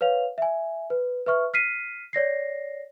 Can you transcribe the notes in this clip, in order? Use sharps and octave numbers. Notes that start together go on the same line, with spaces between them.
B4 C#5 F5 F7
E5 G#5
B4
B4 E5 C#6 F6
F6 B6 C7 D#7
C#5 D5 A#6 C7